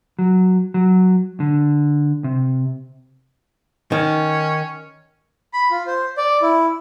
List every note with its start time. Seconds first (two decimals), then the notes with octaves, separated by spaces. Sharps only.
0.19 F#3
0.74 F#3
1.40 D3
2.24 C3
3.92 D#3 C#4
5.53 B5
5.71 F4
5.87 C5
6.18 D5
6.42 E4